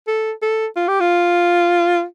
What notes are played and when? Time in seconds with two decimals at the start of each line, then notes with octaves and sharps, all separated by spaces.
0.08 A4
0.42 A4
0.76 F4
0.88 G4
1.00 F4